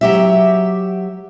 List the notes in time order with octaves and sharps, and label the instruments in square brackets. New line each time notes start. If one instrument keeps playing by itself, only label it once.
[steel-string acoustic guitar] F#3 G4 E5